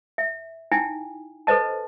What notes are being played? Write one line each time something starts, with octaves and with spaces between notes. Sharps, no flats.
E5
D#4 E4 G5 G#5
A4 B4 C5 D#5 A5